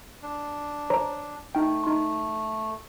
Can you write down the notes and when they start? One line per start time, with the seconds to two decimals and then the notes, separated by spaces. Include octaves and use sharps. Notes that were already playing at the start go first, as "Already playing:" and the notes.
0.22 D4
0.90 C5 C#5 A#5
1.55 A3 D#4 G5
1.84 D#4 C6